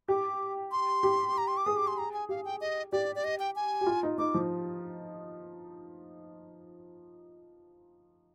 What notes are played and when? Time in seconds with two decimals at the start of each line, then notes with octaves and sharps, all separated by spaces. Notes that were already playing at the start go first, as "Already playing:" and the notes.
0.08 G4 D6
0.72 C6
1.03 G4
1.38 A#5
1.48 C6
1.57 D6
1.66 G#4 D#6
1.77 D6
1.87 C6
1.98 A#5
2.14 G#5
2.29 G4 F5
2.45 G5
2.61 D#5
2.92 G4 D5
3.15 D5
3.24 D#5
3.39 G5
3.56 G#5
3.81 G4
3.87 F4
4.03 D#4
4.18 D#4 D6
4.34 F3